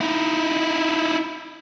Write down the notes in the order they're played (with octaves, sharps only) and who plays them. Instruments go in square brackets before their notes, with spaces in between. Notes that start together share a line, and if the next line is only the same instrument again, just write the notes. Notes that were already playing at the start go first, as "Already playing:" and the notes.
[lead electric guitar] D#4 E4